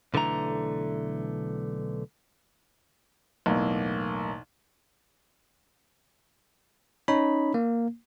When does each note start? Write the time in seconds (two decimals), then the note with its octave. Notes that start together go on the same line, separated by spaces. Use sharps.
0.14 B1 D3 E3 A3 A#5
3.46 B1 E2 A2 A#3
7.08 C#4 D#4 C#5 B5
7.54 A#3